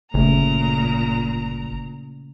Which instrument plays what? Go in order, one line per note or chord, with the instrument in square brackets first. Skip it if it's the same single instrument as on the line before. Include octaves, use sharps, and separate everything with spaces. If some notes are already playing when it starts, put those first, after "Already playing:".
[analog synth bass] G1 [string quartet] A#2 A#5 [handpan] C#3 A3